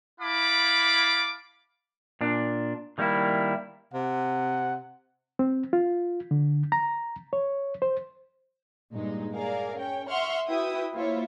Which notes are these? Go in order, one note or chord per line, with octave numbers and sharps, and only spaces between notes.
E4 F5 A5 B5 D6
A#2 D4
D#3 G3 A#3 D#4 E4
C3 F#5
C4
F4
D3
A#5
C#5
C5
G2 A#2 G#3 D#4
A#3 G#4 A#4 D5 F5
C#4 C#5 G5
E5 F#5 C6 C#6 F6
E4 F#4 B4 E5 G5 D#6
A#3 E4 F4 C5 C#5 E5